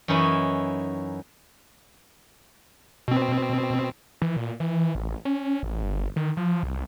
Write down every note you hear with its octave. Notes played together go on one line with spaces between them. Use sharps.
F#2 E3 C#4 D#4 E4
B2 C4
E3
A#2
E3
A1
C#4
A1
G1
D#3
F3
C2